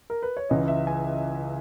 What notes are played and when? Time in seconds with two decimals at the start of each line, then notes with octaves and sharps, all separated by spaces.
0.10 A#4
0.23 B4
0.37 C#5
0.49 C#2 C#3 E3 D#5
0.68 E5
0.87 G#5